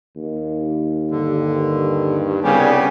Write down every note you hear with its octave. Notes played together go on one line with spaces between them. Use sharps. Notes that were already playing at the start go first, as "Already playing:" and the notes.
D#2
G2 D3
C2 C#3 G3 B3 G4 G#5